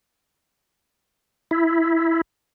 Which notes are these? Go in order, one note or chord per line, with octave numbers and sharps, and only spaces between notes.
E4